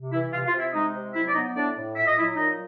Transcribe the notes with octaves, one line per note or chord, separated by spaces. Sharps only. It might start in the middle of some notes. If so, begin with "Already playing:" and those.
Already playing: C3
E3 E4 E5
C3 F4 F5
F4 F5
C3
E4 E5
G#3 D#4 D#5
C3
F#3 E4 E5
D5
B3 D#4 D#5
A2 D4 D5
A2
A#2 E5
D#5
F#3 E4 E5
A#2 D#4 D#5